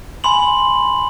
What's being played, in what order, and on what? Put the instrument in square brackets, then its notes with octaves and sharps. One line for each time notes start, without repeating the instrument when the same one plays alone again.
[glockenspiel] G#5 B5 C6 F#7